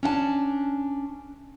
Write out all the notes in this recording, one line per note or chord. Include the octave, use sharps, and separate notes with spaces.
C#4 D4 F#5 A5